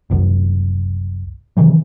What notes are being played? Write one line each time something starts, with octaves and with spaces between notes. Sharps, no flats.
F#1 C2 F#2
C3 D#3 E3 F#3